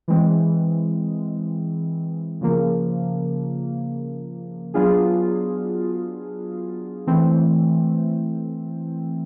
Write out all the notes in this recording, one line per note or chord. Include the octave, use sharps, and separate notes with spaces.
E3 G#3 C4
C#3 F3 A#3
F#3 B3 D4 F4 G#4
E3 A3 C4